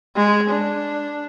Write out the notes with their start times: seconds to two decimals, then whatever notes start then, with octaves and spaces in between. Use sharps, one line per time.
0.16 G#3
0.50 D4